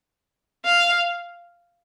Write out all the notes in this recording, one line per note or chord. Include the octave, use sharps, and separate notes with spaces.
F5